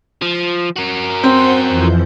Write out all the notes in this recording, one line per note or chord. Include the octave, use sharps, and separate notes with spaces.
F3
F#4 A#4
C4 C5 F#5 G6
F2 E3 F3